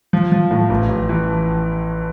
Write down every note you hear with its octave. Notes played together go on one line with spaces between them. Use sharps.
F3
F3
A2
A1
A1
E3